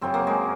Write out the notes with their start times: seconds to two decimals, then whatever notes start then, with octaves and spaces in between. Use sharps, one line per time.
0.01 F#2 C#3 F#3 C4
0.14 A#3
0.27 G#3